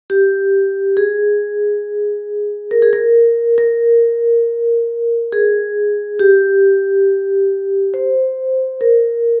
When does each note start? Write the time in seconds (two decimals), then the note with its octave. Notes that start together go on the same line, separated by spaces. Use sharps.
0.10 G4
0.97 G#4
2.71 A#4
2.82 G#4
2.93 A#4
3.58 A#4
5.32 G#4
6.19 G4
7.94 C5
8.81 A#4